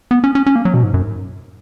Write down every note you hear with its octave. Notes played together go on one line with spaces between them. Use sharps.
B3
C#4
C#4
C#4
A#3
F#3
B2
G#2
F#2